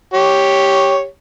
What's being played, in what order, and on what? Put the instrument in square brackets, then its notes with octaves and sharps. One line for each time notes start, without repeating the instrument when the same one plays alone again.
[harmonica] G4 C#5